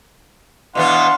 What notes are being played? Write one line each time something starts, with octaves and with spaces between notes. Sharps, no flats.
B2 E3 B3 D4 F5 F#5 C6